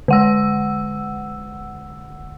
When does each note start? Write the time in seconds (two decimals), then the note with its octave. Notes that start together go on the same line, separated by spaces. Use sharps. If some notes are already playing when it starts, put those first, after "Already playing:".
0.08 D3 F#5 E6